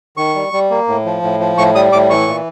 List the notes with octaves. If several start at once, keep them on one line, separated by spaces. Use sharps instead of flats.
D#3 C#6
G3
G3
A#3
A2
F3
A2
F3
A2 C#6
G3 D#6
A2 D6
E3 C#6
A#2